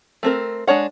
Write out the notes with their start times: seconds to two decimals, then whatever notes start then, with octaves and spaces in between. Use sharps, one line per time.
0.23 A3 C4 A#4
0.67 G#3 D4 C#5 F#5